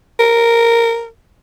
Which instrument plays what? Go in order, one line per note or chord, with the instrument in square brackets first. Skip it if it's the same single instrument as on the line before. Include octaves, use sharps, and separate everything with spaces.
[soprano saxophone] A#4